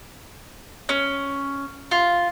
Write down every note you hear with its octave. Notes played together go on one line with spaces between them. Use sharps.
C#4
F4